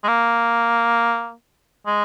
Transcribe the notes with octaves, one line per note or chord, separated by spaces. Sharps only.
G#3
A#3
G#3